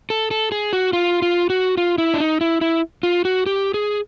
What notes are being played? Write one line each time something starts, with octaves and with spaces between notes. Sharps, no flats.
A4
A4
G#4
F#4
F4
F4
F#4
F4
E4
D4
D#4
E4
E4
F4
F#4
G4
G#4